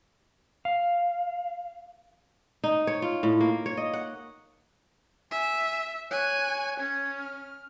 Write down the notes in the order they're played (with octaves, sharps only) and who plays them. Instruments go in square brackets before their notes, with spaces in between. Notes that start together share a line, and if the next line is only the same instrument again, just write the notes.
[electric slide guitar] F5
[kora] D#4
C#5
F4
A2
A#3
C#5
D#5
F#5
[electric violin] E5 [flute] G#5
[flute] C#5 [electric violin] G#5 F#6
[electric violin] C#4 [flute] G#6
[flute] F6